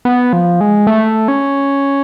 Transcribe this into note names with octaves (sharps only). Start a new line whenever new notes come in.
B3
F3
G#3
A3
C#4